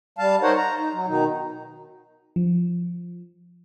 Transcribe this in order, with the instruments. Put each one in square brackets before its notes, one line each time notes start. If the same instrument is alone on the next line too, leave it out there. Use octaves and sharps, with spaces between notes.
[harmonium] G3 F5 A5
D#4 A#4 C5 C#5 F#5
A#5
D#4
F#3
B2 D#3 D#4
[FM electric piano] F3